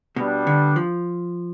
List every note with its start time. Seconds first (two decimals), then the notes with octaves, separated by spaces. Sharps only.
0.16 B2 G3 B3 D4
0.47 D3
0.76 F3